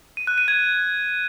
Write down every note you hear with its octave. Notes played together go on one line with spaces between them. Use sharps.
D#7
F#6
D#7
G#6